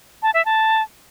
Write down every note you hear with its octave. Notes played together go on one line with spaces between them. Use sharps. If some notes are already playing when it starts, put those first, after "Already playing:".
A5
E5
A5